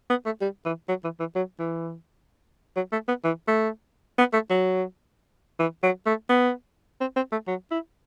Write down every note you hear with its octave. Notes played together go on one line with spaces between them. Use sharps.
B3
A3
G3
E3
F#3
E3
E3
F#3
E3
F#3
A3
B3
E3
A3
B3
A3
F#3
E3
F#3
A3
B3
C4
C4
A3
F#3
E4